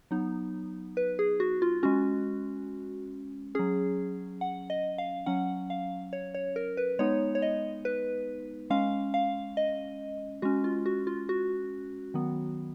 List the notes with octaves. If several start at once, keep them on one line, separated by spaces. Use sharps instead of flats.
F#3 B3 D#4
B4
G#4
F#4
F4
G#3 C#4 F#4
F#3 C#4 G#4
F#5
D#5
F5
F#3 C#4 F#5
F5
C#5
C#5
A#4
B4
G#3 B3 D#4 C#5
C#5
D#5
B4
G#3 C#4 F5
F5
D#5
G#3 C#4 F#4
F4
F#4
F4
F#4
D#3 F#3 B3